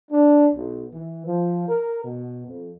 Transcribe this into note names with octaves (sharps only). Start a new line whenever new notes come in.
D4
B1
E3
F3
A#4
B2
F2